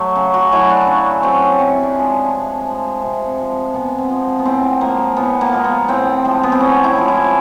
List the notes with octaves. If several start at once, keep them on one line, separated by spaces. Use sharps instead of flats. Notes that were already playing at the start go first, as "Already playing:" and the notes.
Already playing: F#3 A3
C#3
F#4
F#3 A3 E4
D4
C#3
F#3 A3 C4
C3 C#4
D4
F3 G#3
C3
F3 G#3
C3
F3 G#3
C3 B3
C4
F3 G#3
B3
A2 C4
F3 G#3 A#3
A2 B3
A#3
F3 G#3
B3
A2 C4
F3 G#3
B3
C4
A2 C#4
E4
F3 G#3
E4